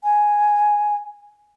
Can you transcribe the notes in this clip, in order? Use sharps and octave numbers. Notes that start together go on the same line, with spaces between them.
G#5